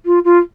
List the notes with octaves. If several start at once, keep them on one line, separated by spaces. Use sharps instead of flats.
F4
F4